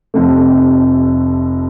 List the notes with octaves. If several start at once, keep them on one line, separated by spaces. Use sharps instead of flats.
F1 F2 C3 A3